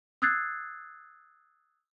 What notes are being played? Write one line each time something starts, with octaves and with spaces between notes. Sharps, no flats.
D#6 E6 F#6 G#6 A6 C7